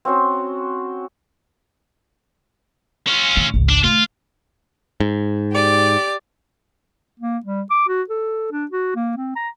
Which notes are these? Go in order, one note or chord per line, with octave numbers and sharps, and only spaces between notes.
C4 C#4 F#4 C5
C#4 F4
A2 D#3
G#1 C#2
D4
D#3 A3 F4
G#2
G4 D5
A#3
G3
D6
F#4
A4
D4
F#4
A#3
C4
A#5